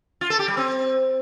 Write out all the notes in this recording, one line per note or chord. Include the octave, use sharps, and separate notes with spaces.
F4
A4
G4
G3
C4